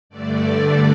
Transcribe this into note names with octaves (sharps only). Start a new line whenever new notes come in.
G2 D3 A3 D5